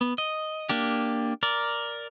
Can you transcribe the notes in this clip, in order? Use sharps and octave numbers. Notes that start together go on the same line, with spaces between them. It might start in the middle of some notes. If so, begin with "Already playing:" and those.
B3
D#5
A#3 D4 G4
A#4 D5